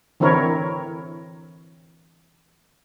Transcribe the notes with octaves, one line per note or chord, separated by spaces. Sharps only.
D3 E3 C4 E4 A#4 C#5